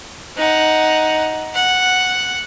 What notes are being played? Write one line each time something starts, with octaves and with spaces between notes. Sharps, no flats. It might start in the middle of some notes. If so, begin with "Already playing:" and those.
D#4 F#5
F#5